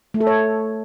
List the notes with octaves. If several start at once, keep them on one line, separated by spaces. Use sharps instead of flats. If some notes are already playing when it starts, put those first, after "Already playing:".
A3
A4
C#5